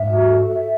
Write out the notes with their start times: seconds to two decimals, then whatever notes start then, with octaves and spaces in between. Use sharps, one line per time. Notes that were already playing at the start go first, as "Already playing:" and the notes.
Already playing: G#2 E5
0.09 F#4
0.28 A4
0.48 E5